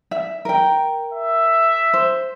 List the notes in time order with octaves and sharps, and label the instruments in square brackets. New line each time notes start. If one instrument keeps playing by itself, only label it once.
[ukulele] E5
A#4 G5
[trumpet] E5
[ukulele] C5